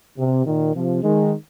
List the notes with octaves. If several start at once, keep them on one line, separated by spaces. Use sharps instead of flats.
C3
A#2 D#3
C3 F3
D#3 G#3